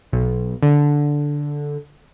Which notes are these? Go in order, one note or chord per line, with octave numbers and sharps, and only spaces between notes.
B1
D3